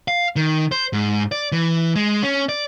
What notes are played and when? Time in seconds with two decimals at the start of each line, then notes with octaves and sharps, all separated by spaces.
0.08 F5
0.36 D#3
0.72 C5
0.93 G#2
1.32 D5
1.52 E3
1.96 G#3
2.23 C#4
2.49 D5